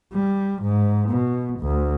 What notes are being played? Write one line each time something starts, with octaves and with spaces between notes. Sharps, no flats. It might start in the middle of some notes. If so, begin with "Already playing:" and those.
G3
G#2
B2
D2